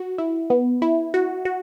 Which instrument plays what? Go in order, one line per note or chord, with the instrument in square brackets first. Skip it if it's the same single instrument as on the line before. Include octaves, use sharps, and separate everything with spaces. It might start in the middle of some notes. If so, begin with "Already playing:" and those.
Already playing: [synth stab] F#4
E4
B3
E4
F#4
F#4